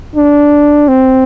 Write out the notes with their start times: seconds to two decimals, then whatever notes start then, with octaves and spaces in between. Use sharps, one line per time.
0.16 D4
0.88 C4